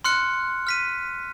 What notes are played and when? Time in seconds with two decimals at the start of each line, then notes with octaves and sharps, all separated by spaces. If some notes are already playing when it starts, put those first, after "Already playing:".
0.04 C6 F6 F#6 C#7
0.67 F6 B6 D#7